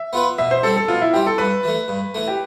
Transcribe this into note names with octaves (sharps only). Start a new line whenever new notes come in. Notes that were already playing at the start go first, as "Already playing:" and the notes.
Already playing: E5
B3 F4 B4
B2 E5
C5
G3 C4 A4
A4
B2 F4
E4
G3 C4 G4
A4
G2 B4
E3 A3
G2
E3 A3
G4